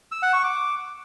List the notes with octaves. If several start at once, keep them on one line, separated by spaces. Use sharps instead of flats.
E6
F#5
C#6
D6